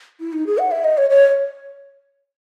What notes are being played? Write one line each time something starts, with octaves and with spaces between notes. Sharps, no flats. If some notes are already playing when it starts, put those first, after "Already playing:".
E4
D#4
G#4
F#5
E5
D#5
C#5
C#5